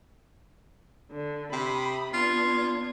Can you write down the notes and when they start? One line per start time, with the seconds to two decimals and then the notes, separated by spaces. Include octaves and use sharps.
1.11 D3
1.53 C3 B5 D#6
2.14 B3 D4 F4 G#6